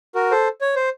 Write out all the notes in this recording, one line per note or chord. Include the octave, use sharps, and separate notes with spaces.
F#4 A#4
A4 C5
C#5
C5